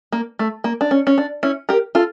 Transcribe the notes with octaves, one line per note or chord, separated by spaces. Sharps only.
A#3
A3
A#3
D4
C#4
C#4
D4
C#4 E4
G4 A#4
F4 A4